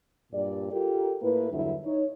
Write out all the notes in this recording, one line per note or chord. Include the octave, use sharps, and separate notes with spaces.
G2 A#2 G4 D5
F4 G4 A4 A#4
A2 A#3 E4 B4
E2 G2 D3 F#3 E4
D#4 C#5